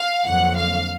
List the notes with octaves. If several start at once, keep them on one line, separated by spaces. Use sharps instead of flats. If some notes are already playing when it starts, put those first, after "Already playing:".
Already playing: F5
F2 D3 F#3 A#3 F#5
F5